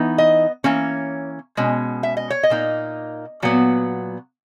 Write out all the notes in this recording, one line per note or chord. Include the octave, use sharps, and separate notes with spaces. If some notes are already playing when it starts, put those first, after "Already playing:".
Already playing: E3 B3 D#4
D#5
E3 A#3 C#4 C#5
B2 G#3 C#4
E5
D#5
C#5
D#5
A#2 A#3 D#4
A#2 F#3 B3